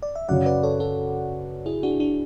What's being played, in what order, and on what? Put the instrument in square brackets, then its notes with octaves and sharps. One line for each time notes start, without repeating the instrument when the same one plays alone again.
[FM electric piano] D5
E5
[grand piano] F#2 C#3 F#3 C#4 [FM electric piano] D5 F#5
[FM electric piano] B4 D5
A4 C#5
F#4 A4
E4 G#4
D4 F#4
D4 F#4